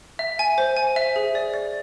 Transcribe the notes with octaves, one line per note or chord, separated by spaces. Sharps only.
E5
G#5
C5
G#5
E5
G#4
D5
D5